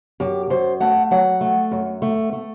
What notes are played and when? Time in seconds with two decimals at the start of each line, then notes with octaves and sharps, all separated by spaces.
0.20 F#2 G4
0.50 F#2 C5
0.80 A3 F#5
1.11 F#3 F#5
1.41 A3
1.71 F#2
2.02 A3
2.33 A3